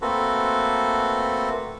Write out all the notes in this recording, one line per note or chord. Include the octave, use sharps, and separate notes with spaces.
A3 A#3 C4 F#4 A4 B4